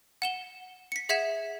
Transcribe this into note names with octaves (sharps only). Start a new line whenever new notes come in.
F#5 E7 G7
B6 C#7
G#4 E5 F#5 G#6 B6 E7